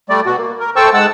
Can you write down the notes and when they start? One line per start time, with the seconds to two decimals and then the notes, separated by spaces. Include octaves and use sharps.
0.09 G3 A3 D5
0.26 B2 F#4
0.37 A#3
0.60 A#4
0.76 A3 C5 G5 A5 C#6 E6
0.94 G#2 G#3 F#5 A5 E6